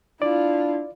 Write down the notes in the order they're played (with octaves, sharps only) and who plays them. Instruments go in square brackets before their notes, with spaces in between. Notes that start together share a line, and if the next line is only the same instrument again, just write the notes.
[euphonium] D4 [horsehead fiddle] E4 F4 [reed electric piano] D5